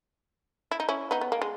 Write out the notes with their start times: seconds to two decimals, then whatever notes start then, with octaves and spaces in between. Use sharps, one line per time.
0.71 E4
0.80 D#4
0.89 C#4 E4
1.11 B3 D#4
1.21 B3
1.32 A#3
1.42 G#3